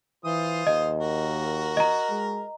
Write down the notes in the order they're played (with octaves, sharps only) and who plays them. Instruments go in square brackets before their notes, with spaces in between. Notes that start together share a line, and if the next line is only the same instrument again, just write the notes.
[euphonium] E3 [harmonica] F4 C5 D#6
[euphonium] D#2 [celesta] D#5
[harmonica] F#4 A#4
[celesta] D#5 A#5
[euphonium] G#3